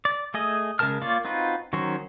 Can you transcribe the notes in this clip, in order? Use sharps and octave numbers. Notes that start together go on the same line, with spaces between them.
D5
A3 G#4 D#5
C#3 G#3 A#4 A5 F6
A#3 F4 C#5 D5
C4 D#4 F4 F#4 B4
D#3 F#3 C#4 F#4 C5